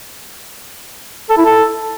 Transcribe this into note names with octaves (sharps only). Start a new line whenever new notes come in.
A4
E4
A4